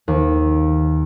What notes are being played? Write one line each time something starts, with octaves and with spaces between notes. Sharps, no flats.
D#2